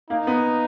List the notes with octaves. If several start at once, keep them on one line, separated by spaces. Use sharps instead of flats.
A#3 D#4
B3